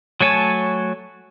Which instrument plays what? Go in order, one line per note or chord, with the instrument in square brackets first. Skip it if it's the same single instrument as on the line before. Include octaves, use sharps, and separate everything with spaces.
[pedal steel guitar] F#3 A3 C#5 G#5 A5